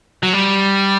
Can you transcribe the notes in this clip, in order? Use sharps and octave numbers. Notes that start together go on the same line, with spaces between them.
F#3
G3